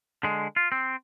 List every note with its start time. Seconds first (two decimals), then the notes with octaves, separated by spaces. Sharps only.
0.23 D3 G#3
0.56 F4
0.72 C4